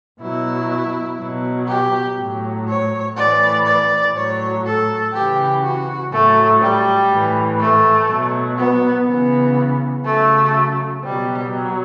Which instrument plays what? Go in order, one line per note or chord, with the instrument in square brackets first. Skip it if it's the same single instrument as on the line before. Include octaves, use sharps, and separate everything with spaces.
[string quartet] B2 F#3 E4
B2 F#3
G4
A2 F#3
C#5
A2 E3 D5
D5
A2 F#3 C#5
A4
C#3 E3 G4
F#4
A2 F#3 A3
G3
A2 E3
A3
B2 F#3
B3
C#3 E3 B3
C#3 F#3 A3
B2 F#3 G3
F#3